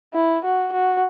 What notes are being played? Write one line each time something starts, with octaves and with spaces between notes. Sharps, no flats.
E4
F#4
F#4